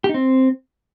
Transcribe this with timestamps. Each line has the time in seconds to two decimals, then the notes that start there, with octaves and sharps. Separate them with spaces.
0.04 G4
0.09 D#4
0.14 C4